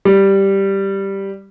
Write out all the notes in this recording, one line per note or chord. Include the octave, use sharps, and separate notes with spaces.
G3